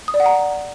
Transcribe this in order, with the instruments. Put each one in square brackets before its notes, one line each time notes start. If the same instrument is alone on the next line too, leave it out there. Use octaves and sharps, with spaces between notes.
[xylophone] D#6
D5
F#5
A#5